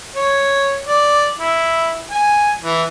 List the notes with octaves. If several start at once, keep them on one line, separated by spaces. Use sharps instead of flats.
C#5
D5
E4
G#5
E3